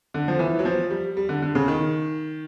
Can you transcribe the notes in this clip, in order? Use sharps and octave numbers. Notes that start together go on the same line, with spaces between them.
D3
F3
E3
F#3
F3
G3
G3
D3
D3
C#3
D#3